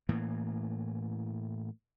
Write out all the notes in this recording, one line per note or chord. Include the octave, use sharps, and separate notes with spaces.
A2 E3 A#3